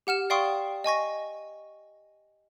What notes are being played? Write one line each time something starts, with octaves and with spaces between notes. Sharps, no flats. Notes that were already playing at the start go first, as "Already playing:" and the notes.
G4 F#5 F6 E7
D5 F5 G5 C6 C#6 D#6
D#5 G#5 C#6 A#6